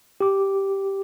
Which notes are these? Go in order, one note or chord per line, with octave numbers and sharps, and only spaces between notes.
G4 D6